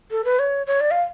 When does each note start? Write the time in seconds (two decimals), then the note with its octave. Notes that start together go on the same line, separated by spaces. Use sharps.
0.11 A4
0.24 B4
0.39 C#5
0.67 C#5
0.80 D5
0.91 F5